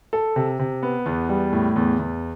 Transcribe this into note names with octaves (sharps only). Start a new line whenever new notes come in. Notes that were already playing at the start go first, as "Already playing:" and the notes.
A4
C3
C3
B3
E2
G3
A2
E2
E2